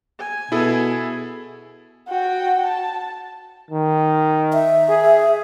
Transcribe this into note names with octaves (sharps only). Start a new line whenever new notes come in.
G#5
B2 E4 G#4 A4
F#4 G5
A5
D#3
E5
G#4